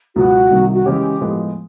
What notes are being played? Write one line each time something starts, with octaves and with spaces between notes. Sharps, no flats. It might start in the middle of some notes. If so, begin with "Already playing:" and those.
C#2 B2 F#3 B3 F#4
C2 C3 D#3 G3
F#4
C#3 E3 G#3 C#4 G4
A2 F3 G#3 B3